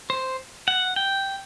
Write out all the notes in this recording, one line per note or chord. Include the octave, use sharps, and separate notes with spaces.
C5
F#5
G5